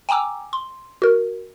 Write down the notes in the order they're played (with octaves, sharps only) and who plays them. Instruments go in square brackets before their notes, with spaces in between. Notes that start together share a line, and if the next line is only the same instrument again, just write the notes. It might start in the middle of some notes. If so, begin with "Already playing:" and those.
[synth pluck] G5 G#5 A#5 D6 E6
C6
F#4 A#4